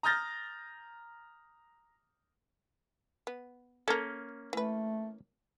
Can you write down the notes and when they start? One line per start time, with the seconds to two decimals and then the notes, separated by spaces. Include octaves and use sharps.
0.03 A#5 D#6 F6 G6 A6 A#6
3.27 B3
3.88 A#3 C#4 A4 A#4
4.53 E3 A3 B4